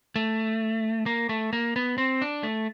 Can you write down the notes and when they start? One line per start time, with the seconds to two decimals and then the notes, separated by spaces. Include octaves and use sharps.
0.16 A3
1.06 A#3
1.29 A3
1.53 A#3
1.76 B3
1.98 C4
2.22 D4
2.43 A3